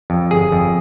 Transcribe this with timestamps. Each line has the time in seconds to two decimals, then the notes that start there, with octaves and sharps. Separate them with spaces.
0.10 F2
0.31 G1 G#4
0.52 F2